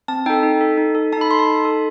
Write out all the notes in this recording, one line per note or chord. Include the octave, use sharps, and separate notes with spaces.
C4 A5
D#4 A4 G5
D#4
A4
D#4
A4
D#4 A5
B5
A4 C6
A5
D#4
A4